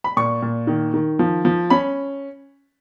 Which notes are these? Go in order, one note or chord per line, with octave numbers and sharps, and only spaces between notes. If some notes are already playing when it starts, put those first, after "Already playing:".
B5
A#2 C#6
A#2
D#3
D#3
F3
F3
C#4 B5